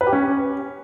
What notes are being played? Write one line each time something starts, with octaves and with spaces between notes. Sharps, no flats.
B4
G4
C#4